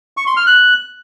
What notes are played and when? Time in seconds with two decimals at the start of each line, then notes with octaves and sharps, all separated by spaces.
0.17 C#6
0.27 C6
0.37 F6
0.47 F#6